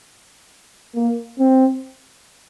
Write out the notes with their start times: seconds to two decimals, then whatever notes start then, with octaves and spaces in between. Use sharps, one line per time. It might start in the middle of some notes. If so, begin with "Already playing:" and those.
0.95 A#3
1.39 C4